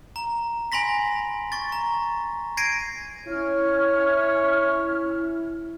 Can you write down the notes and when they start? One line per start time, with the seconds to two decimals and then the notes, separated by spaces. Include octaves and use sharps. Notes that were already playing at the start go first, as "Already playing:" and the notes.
0.16 A#5
0.72 G#5 B5 C6 A#6 B6
1.52 C#6 A6
1.72 A#5
2.57 G#6 A#6 C7 D7 D#7
3.27 C#4 E4 C#5 F6